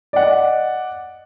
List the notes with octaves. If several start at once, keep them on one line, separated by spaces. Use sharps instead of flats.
D5 D#5 F#5